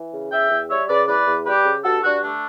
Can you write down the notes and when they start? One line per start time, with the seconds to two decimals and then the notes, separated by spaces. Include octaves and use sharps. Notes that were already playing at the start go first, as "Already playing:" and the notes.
Already playing: E3
0.13 C#3
0.31 E2 E5 G5
0.51 E2
0.70 G3 C#5 E5
0.89 C#3 B4 D5
1.08 E2 B4 D5
1.27 E2
1.46 G3 G4 B4
1.66 C#3
1.85 G2 F#4 A4
2.04 G2 D4 F#4
2.23 A3 D4